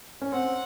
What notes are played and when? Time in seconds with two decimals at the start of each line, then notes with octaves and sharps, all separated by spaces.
0.22 C#4
0.32 C4 F#5